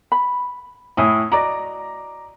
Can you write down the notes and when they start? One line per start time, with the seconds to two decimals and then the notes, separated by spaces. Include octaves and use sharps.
0.12 B5
0.97 A2 E4 G#5 D#6
1.32 F#4 D5 D#5 A#5 D6